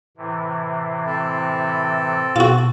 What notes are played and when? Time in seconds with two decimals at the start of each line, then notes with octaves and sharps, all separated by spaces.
0.17 A2 C3 E3
1.06 C4 A4
2.36 B2 F4 F#4